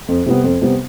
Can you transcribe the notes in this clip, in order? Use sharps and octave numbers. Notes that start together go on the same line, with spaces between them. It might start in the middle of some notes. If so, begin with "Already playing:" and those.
F2
C3 G3 B3
F2
C3 G3 B3